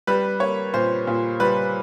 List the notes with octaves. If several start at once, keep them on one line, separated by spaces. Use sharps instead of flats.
G3 B4
A#3 C#5
A#2 C5
A#2
G3 B4